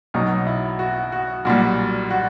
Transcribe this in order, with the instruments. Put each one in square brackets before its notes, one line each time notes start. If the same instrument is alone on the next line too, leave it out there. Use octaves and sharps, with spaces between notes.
[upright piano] B1 B2 F#3 D#4
E4
F#4
F#4
B1 A#2 G3 F#4
F#4